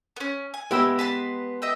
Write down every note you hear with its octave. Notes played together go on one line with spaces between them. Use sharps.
B3 C#4
G#5
G#3 B3 E4 G4 B5 E6
B4 A5 C6
D#5 E5 G5